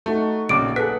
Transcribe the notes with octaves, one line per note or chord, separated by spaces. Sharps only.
A3 D#4 F#4 A4
A#1 C#3 F#3 A#3 D6 D7
G#4 A4 B4 F#5 B6